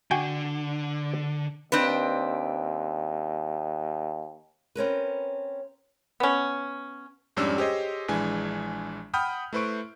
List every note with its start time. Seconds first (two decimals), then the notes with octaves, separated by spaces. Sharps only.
0.11 D3 F#4 G5 G#5
1.72 D#2 C4 D4 B4
4.75 C4 C#4 A#4 B4
6.20 B3 C#4
7.37 F2 G#2 G3 C#4 D4 E6
7.58 G4 G#4 C5 C#5 D#5
8.08 A#1 E3 G#3 D4 G#5
9.14 F#5 G5 B5 D#6 F6 G6
9.53 A3 E4 B4 C5 C#6 D7